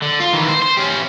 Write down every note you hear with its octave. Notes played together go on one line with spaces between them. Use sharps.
D3
F4
D#3 E3
C5
C5
C#4 G4